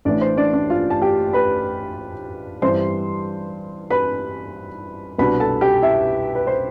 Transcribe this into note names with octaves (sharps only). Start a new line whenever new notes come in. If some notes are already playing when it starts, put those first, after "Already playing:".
A1 A2 E3 D4 D5
C5
D4 D5
D4 D5
F4 F5
A5
G4 G5
B4 B5
G2 E3 G3 C4 C5 C6
B4 B5
C2 B2 B3 D4 B4 B5
A4 A5
G4 G5
E4 E5
B4
C5